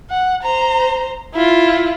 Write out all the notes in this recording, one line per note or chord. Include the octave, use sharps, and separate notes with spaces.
F#5
C5 A#5
E4 F4